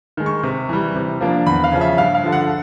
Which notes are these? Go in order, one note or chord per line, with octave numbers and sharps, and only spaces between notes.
D#3 G#3
C#6
C3
E3 G3
C3
F3 A#3 D4
E2 B5
F5
C#3 F3
E5
G2 F5
F5
D3 F3
F#5